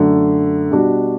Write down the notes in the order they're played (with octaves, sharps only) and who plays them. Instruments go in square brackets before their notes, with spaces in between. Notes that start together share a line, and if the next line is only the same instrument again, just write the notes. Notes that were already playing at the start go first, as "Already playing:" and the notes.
Already playing: [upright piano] F#2 D3 A3
B2 G3 D4 F#4